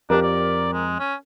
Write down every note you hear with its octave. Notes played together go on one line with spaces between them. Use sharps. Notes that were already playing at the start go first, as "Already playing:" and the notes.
F2 D4 G4 A#4
D5
G#3
C#4